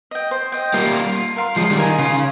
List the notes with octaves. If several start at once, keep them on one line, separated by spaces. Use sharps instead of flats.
D#5 G5
C5
D#5 G5
G3 A#3 F4
A#4 F5 C6
F4
A#4 F5 C6
F3 G#3 F4
D#3 G3
A#4 D#5 G#5
D#3
C#3 F4